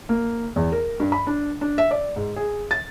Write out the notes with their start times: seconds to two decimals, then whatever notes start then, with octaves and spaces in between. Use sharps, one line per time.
0.09 A#3
0.56 E2
0.72 A#4
1.00 G2
1.12 B5
1.27 D4
1.61 D4
1.78 E5
1.91 D5
2.16 G#2
2.36 G#4
2.71 A6